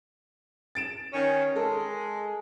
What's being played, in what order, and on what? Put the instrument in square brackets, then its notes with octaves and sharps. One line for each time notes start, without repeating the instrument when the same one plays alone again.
[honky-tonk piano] A6 D7 E7
[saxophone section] D#3 C#4
[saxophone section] G#3 [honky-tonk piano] A4 A#4